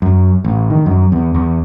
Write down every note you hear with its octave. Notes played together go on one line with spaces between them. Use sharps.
F#2
A1
D#3
F#2
E2
E2